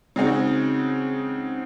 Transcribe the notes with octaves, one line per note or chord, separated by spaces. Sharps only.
C#3 G#3 C4 D#4 F#4